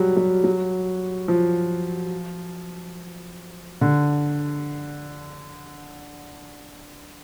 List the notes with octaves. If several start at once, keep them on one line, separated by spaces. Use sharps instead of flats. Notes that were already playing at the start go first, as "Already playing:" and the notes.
Already playing: F#3 G3
F#3
F#3
F3
D3